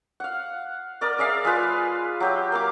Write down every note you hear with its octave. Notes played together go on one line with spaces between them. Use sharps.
F5 F#5
A#4 D5 D#5
G#4 D5 E5 F5
G#3 F4 B4 F5
F#3 G4 E5
A#3 F5 D6